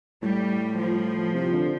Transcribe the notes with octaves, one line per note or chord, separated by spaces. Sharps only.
A2 G3
F3
C3
D3